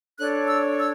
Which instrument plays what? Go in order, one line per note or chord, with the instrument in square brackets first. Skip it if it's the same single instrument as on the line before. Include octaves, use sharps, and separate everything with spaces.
[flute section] D4 A4 C#5 F#6
E6
E6